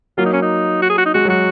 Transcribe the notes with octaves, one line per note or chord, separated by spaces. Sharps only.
F#3 A#3 F4
D#4
C#4
D#4
F#4
G#4
F#4
D#4
G#3 F#4
F#3 F#4